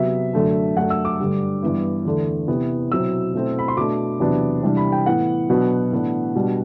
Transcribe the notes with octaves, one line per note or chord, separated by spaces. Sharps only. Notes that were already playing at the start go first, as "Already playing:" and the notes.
Already playing: C3 F#3 B3 E5
F#2 D3 A3 D4
F#2 F#3 A3 D4 F#5
E6
D6
G2 D3 G3
G2 E3 B3 E4
E2 D3 A3
C3 E3 B3
B2 F#3 C4 E4 E6
B2 A3 C4 E4
B5
C6
B2 A3 D4 D6
E2 C3 F#3 B3 D4
C3 E3 G3 D4
B5
G5
A2 E3 B3 F#5
B2 F#3 B3 D4
A2 E3 B3 D4
B2 G3 B3 D4